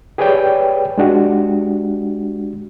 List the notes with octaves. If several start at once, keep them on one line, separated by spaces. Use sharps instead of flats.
G4 G#4 B4 C#5 D5 G5
G#3 D4 F#4 G4